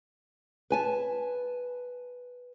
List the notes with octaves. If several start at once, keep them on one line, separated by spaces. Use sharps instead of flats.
B4 G#5 A5